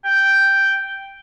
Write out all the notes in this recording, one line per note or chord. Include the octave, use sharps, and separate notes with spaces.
G5